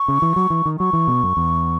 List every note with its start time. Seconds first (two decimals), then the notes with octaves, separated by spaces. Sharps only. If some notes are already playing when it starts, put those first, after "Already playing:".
Already playing: C#6
0.08 C#3
0.22 E3
0.36 F#3
0.50 E3
0.66 D#3
0.79 F#3 C#6
0.93 E3
1.08 B2
1.23 F#2
1.37 E2